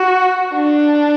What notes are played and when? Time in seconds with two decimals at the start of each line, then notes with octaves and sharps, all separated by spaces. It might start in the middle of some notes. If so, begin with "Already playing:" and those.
Already playing: F#4
0.54 D4